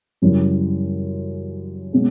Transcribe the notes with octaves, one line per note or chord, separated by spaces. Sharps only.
F#2 C#3 E3 G3
B2 G#3 C#4